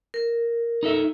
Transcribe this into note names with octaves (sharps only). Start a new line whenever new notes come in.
A#4
D#4 A4 E5